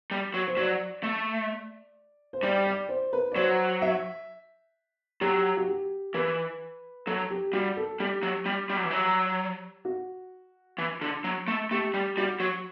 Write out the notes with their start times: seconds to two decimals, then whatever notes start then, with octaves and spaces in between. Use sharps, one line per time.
0.11 G3
0.34 F#3
0.47 C5
0.57 F#3 D5
1.03 A3
2.33 C5
2.43 G3 D5
2.66 D5
2.89 C5
3.13 B4
3.32 D5
3.36 F#3 C5
3.82 E5
5.21 F#3 G4
5.57 F#4
5.68 G4
6.14 E3 B4
7.06 F#3 A4
7.30 G4
7.53 G3 F#4
7.77 A4
8.00 G3 G4
8.23 F#3
8.45 G3
8.70 G3
8.77 F#3
8.84 E3
8.91 F#3
9.85 F#4
10.78 E3
11.01 D3
11.24 F#3
11.48 A3
11.71 A3 G4
11.94 G3
12.17 G3 F#4
12.40 F#3